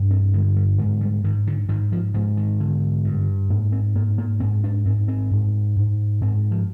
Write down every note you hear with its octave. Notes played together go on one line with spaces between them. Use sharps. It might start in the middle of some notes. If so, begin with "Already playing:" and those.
Already playing: G2 C3
C4
D3 G#3
G3
G#2 D#3
G3
G#2 D#3
D3
G#2 D#3
F3
G#2 F3
D#3
D3
G2
G#2 A#3
C4
G#2 A#3
A#3
G#2 C4
D4
G#2 C4
C4
G#2
G#2
G#2 C4
F3